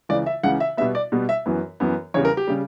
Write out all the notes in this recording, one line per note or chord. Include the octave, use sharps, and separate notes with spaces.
C#2 C#3 E3 D5
E5
C#2 C#3 E3 F#5
E5
B2 G3 B3 E5
D5
B2 G3 B3
E5
F#2 E3 B3
F#2 E3 B3
E2 C#3 G3 C#5
A#4
G4
C#3 G3